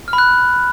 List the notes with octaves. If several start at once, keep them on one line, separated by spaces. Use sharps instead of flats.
F6
B5
F#6